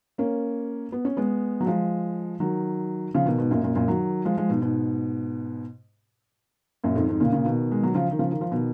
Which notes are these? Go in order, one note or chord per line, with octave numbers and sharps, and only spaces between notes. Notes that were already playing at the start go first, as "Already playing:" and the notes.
A#3 C#4
B3
C#4
G#3 B3
F#3
F3 G#3
D#3 F#3
C#3 F3
B2 D#3
G#2 B2
F#2 A#2
F#2 A#2
F#2 A#2
D#3 F#3
F3 G#3
F3 G#3
G#2 B2
G#2 B2
F#2 A#2
F2 G#2
F2 G#2
A#2 C#3
A#2 C#3
B2 D#3
G#3
F#3
C#3 F3
D#3
C#3 F3
D#3
F3
B2 D#3